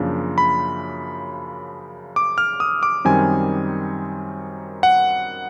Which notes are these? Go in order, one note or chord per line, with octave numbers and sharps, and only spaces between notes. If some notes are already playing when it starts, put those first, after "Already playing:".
Already playing: F#2 C#3 F3 A#3 D4
B5
D6
F6
D#6
D6
F#2 D#3 G3 C4 G#5
F#5